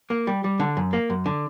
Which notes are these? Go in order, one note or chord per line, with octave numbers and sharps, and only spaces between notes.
A#3
G3
G3
D3
F#2
A#3
F#2
D3